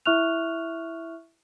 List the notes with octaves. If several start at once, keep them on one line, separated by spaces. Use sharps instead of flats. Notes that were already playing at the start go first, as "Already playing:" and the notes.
E4 E5 C#6 F6 F#6 F7